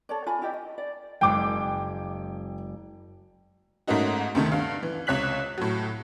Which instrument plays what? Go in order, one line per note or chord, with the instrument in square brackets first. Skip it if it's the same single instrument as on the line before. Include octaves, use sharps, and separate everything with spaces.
[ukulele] A4 C#5 D5
F4 G#5 B5
E4 F4 G4 D#5
D#5
D5
[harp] F#1 G#3 [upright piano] G5 D6
[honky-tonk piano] G#2 A3 A#3 C#4 D#4 F#4
D2 C3 D#3 A3
G2 F5
E3
C#2 C3 C#5 F#6 B6 F#7
A2 F#3